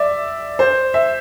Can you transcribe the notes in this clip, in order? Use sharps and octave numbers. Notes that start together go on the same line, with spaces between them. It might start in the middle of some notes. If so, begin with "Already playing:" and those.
Already playing: D5 E5
C5
E5